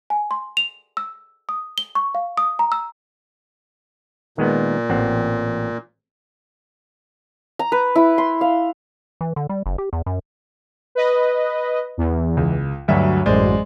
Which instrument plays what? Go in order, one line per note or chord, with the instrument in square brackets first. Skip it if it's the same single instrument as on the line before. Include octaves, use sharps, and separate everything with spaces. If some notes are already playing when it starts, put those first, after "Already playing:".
[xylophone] G#5
C6
F7
E6
D#6
G7
C#6
F5
D#6
A#5
E6
[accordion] A#2 [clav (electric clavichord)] D#3 G#3 B3
[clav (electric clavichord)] A1 C4 F#5
[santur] A#5
B4
E4
C6
F5
[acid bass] E3
D3
G3
F#1
G4
E2
F#2
[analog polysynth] B4 D#5
E2
[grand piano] C#2
[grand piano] D2 G2 E5 [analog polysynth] F#3
[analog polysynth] A1 F#2 [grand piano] G#3 C5 D5